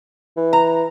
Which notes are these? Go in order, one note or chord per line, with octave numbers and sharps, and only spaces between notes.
E3
A#5